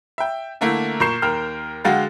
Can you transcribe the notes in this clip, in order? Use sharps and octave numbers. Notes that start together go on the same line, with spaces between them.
E5 G5
D3 A3 A#3 E4
A#2 A#4 C#6 G6 C7 E7
D#2 A#4 G5 F6
D3 G#3 F#4 F5 G5 A6